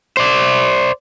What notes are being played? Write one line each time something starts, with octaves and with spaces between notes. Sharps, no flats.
C5 D5